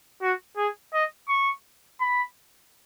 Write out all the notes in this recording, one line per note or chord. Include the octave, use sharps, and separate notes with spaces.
F#4
G#4
D#5
C#6
B5